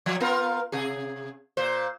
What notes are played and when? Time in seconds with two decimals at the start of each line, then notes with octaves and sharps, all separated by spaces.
0.06 F3
0.20 B3 F4 A#4
0.72 C3 G#4
1.57 A#2 C5